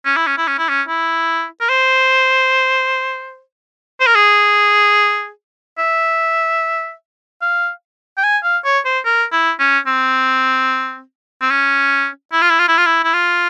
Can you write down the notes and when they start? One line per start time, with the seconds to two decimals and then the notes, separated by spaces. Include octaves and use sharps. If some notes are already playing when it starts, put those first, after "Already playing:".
0.05 C#4
0.17 E4
0.27 C#4
0.38 E4
0.47 C#4
0.58 E4
0.69 C#4
0.88 E4
1.61 A#4
1.69 C5
4.01 C5
4.07 A#4
4.15 G#4
5.78 E5
7.41 F5
8.18 G5
8.23 G#5
8.43 F5
8.65 C#5
8.85 C5
9.05 A#4
9.32 E4
9.60 C#4
9.87 C4
11.42 C4
11.50 C#4
12.32 E4
12.42 F4
12.50 E4
12.59 F4
12.68 E4
12.77 F4
12.86 E4
13.04 E4
13.14 F4